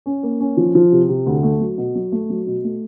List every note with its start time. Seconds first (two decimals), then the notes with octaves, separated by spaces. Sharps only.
0.06 C#4
0.23 A#3
0.40 C#4
0.57 F3
0.75 F3
0.92 C3
1.09 C3
1.26 D2
1.43 A3
1.60 F#3
1.78 B2
1.95 F#3
2.12 A3
2.29 F#3
2.47 B2
2.64 A3